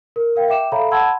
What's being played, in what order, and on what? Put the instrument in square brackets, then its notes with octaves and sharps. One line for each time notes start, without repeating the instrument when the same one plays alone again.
[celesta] A#4
A#4 F5 G5
E5 G5 D6 E7
A4 C#5 E5 F5 A#5 B5
F#5 A5 B5 C6 E6 G#6